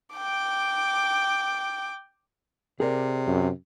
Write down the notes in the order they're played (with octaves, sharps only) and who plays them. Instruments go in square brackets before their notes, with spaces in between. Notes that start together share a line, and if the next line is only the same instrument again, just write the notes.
[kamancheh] G5 D6
[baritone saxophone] C3 [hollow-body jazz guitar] G#4 A#4 D5
[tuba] F#2